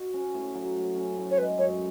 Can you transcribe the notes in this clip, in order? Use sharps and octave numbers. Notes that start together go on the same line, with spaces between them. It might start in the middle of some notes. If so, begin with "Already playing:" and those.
Already playing: F#4
C#4
A2
F#3
A2
C#4
A2
C#5
G#3 B4
F#2 C#5